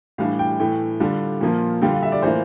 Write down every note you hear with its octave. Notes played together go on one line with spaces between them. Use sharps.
A2 E3 G3 D4 F5
G5
A2 E3 A3 G5
D3 G3 D4 F4
A#2 F3 A#3 F4
D3 G3 D4 F4 G5
F5
E5
D5
A2 E3 A#3 F4 C5